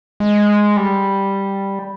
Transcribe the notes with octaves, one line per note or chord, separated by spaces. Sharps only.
G#3
G3